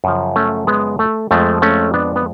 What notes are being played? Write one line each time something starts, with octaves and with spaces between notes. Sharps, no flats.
F#2 C#3 F3
A3 C#4
G#3 B3
A3
F2 F3 G#3 A3
A3 C#4
B3 D4
B3